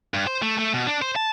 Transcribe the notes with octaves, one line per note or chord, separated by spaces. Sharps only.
G2
C5
A3
A3
B2
D4
C5
A5